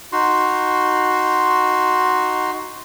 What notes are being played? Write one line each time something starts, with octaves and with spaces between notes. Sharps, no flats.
D#4 F#4 C6